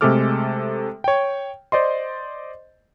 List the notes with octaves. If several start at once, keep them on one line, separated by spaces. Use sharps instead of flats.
C3 G#3 A3 A4 D6 F6
C#5 G5
C5 D5 D#5 C6